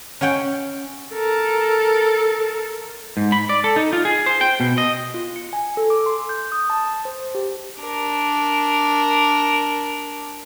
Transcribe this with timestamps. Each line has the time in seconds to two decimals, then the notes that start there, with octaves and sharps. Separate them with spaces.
0.21 C#4 C#5 F#5 G5
1.14 A4 A#4
3.17 G#2
3.32 B5
3.49 D5
3.64 A4
3.76 D#4
3.93 F4
4.05 G#4
4.26 C5
4.41 G5
4.60 B2
4.78 D#5
5.14 F4
5.36 C#7
5.53 G#5
5.77 A4
5.90 D6
6.06 C6
6.29 G6
6.52 D#6
6.70 A5
7.05 C5
7.35 G4
7.82 D4 A#4